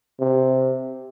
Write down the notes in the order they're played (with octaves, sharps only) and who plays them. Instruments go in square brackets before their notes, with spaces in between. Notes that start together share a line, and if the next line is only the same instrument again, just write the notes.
[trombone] C3